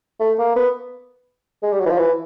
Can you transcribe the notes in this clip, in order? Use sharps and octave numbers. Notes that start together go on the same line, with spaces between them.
A3
A#3
B3
G#3
G3
F#3
E3
F3
E3